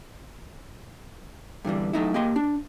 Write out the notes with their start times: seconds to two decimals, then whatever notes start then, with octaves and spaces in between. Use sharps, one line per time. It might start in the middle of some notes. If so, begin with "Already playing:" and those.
1.65 G2 D3 E3 G3
1.93 F#3 A3 D#4 E4
2.14 A#3 G4 D#5 C6
2.36 D4